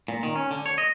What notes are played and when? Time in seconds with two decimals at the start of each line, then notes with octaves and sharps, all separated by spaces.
0.08 A#2
0.23 D#3
0.36 C#4
0.51 D3
0.66 C#5
0.78 D#5